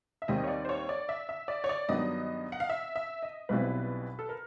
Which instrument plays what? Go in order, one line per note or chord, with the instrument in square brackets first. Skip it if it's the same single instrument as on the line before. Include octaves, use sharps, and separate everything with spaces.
[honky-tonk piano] E5
[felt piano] D#2 D#3 G3 C4 [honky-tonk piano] D#5
[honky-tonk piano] C#5
D5
C5
C#5
D5
E5
E5
D5
C#5
D5
[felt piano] G2 D#3 F#3 B3 D4 [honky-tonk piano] D#5
[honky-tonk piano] F#5
F5
E5
E5
D#5
[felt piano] B1 B2 G3 C4 E4 [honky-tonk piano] B4
[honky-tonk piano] A4
A#4